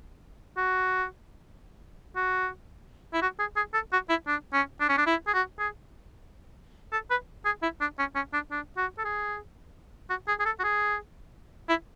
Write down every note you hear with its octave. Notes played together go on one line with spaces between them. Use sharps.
F#4
F#4
E4
F#4
G#4
G#4
A4
F#4
E4
D4
C#4
D4
C#4
D4
E4
G#4
F#4
G#4
A4
B4
G#4
E4
D4
C#4
C#4
D4
D4
F#4
A4
G#4
F#4
G#4
G#4
A4
F#4
G#4
E4